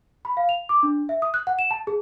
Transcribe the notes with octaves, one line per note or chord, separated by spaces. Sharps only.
B5
F5
F7
D6
D4
E5
D#6
F#6
F#5
E7
A5
G#4